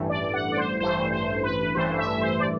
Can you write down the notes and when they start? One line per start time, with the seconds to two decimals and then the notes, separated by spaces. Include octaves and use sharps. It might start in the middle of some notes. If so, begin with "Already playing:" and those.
Already playing: A1 G2 E3 A3
0.09 D5
0.34 F#5
0.52 D5
0.57 C5
0.80 A1 G2 E3 A3 C5
1.12 C5
1.43 B4
1.75 A1 G2 E3 A3 C5
1.98 E5
2.21 C5
2.40 D5